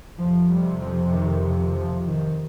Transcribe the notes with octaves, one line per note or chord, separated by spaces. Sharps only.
F2 C3 F3
G3
F3
D#3
F3
F3
D#3